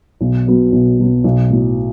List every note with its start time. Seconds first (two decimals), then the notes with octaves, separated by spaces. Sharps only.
0.21 B1
0.47 B2 F#3 B3
0.72 B1
0.99 B2 F#3 B3
1.24 B1
1.50 A2 F#3 B3